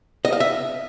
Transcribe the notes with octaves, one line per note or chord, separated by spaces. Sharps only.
D#5
F5
E5